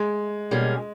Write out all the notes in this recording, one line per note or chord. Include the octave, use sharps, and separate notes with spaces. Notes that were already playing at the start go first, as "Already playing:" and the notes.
Already playing: G#3
B2 G3 A#3 C#4 G#4